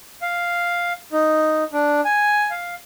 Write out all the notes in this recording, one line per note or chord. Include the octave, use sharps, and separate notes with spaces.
F5
D#4
D4
G#5
F5